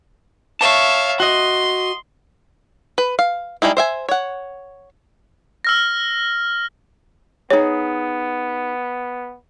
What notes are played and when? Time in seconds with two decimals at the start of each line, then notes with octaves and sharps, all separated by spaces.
0.61 C#5 E5 F5 A5
1.20 F#4 D#5 C6
2.98 B4
3.19 F5
3.62 G3 G#3 D#4 E4
3.77 C5 E5 G#5
4.09 C#5 F#5
5.65 E6 F6 A#6
7.50 B3 D#4 G#4 C#5